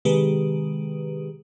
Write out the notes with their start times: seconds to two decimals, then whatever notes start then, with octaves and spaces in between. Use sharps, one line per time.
0.05 C3 D#3 G#3 G4 G#4 B4